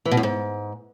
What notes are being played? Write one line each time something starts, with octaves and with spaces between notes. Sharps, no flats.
E3
B2
F#2
G#2